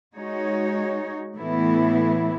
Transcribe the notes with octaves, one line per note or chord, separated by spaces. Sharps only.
G#3 D#4 F#4 C#5
A2 E3 B3 E4